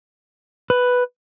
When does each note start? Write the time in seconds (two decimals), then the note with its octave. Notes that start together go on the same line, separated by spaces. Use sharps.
0.70 B4